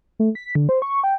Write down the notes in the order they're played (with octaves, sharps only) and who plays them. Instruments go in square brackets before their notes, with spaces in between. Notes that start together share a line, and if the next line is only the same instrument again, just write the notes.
[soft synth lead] A3
B6
D3
C5
C#6
G5